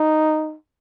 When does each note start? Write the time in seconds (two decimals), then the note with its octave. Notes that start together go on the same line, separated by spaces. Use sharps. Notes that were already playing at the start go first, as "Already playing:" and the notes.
Already playing: D#4